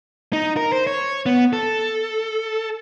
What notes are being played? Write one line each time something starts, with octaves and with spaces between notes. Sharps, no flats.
D#4
A#4
C5
C#5
B3
A4